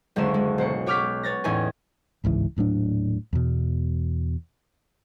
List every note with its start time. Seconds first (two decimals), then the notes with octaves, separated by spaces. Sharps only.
0.16 F#1 D2 G#3 C#4 E7
0.34 G#3
0.58 B1 C5 C#7
0.86 F#4 C#5 D6 F6 G6 B6
1.23 B3 C#5 A6 A#6
1.44 E2 A2 C#4 D#4 E4 G#5
2.24 G1 C#2 G#2 E3
2.56 D#1 A2 F#3 D4
3.33 E2 B2